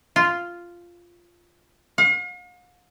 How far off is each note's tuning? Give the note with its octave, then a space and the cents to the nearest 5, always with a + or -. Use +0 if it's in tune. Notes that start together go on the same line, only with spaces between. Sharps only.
F4 -5
F5 +45